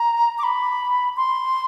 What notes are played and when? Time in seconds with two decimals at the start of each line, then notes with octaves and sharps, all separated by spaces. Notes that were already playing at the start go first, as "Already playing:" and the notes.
Already playing: A#5
0.38 D6
0.43 B5
1.17 C6